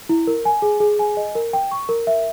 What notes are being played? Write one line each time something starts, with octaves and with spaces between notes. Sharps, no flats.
E4
A#4
G#5
G#4
G#4
G#5
D#5
A#4
G5
C#6
A#4
E5